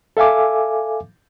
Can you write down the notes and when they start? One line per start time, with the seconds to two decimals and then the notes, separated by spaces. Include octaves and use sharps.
0.17 A4 E5 F5 G#5 D6